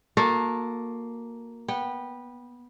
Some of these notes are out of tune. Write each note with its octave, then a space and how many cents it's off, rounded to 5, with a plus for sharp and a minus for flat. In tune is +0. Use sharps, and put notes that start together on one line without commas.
A#3 +0 F#4 -35 A4 +0
B3 -15 G5 +0